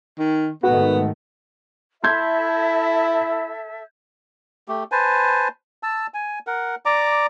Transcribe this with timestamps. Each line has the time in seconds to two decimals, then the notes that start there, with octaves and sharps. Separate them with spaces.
0.19 D#3
0.63 G#2 D#3 A3 B3 F#4
2.04 E4 A4 E5 C6 G6 G#6
4.68 A3 G4
4.92 B4 C5 G#5 A5
5.83 A5 E6
6.14 G#5
6.47 A#4 F#5
6.85 D5 A#5 D6